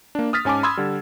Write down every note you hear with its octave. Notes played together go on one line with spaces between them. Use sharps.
A#3 D4
D#6 F6 A6 B6
G#2 C#4 G#5 A5 D6
B5 C6 D#6 E6 G#6
D3 G3